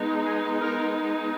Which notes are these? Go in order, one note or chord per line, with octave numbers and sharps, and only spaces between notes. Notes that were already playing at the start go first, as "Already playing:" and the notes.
Already playing: G#3 B3 D#4
G#4
A#4